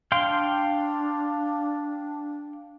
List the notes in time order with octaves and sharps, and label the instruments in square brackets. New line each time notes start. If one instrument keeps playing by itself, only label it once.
[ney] D4 [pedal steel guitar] F5 G5 C6